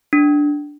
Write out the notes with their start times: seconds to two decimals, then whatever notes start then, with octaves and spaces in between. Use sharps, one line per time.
0.13 D4